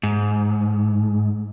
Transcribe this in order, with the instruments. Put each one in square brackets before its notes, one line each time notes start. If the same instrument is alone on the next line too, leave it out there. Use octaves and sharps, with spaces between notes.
[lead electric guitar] G#2